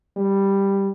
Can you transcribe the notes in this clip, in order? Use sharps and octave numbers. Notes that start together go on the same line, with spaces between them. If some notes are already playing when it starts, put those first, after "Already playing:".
G3